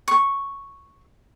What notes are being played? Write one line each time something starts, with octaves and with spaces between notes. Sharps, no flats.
C#6